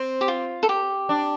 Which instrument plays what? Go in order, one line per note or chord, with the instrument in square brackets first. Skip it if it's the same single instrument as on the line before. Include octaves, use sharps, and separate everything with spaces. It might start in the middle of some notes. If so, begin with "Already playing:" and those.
Already playing: [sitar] C4
[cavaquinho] G4
F4
A4
G4
[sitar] D4